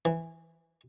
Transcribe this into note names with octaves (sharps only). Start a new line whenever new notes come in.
E3